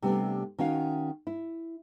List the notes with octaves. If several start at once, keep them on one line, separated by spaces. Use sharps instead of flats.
C3 G3 A3 B3 C4 D4
D#3 C#4 F#4 F5
E4